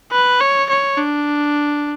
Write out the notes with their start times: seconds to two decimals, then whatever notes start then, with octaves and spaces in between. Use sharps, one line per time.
0.11 B4
0.40 C#5
0.69 C#5
0.98 D4